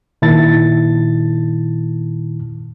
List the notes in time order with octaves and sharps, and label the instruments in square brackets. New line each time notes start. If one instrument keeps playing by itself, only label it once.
[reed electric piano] A#2 D#3 E4 A5 A6